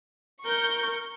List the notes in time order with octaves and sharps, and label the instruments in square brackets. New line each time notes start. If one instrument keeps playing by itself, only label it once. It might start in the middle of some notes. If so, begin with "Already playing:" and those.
[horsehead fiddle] A#4 [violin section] C#6 G6